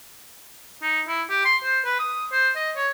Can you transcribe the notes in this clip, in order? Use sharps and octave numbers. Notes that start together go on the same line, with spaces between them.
D#4
E4
G4
C6
C5
B4
D#6
C5
D#5
C#5